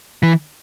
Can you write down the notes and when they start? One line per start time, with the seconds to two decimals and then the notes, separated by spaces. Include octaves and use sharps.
0.23 E3